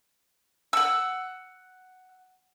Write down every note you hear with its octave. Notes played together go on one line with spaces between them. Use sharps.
F#5 E6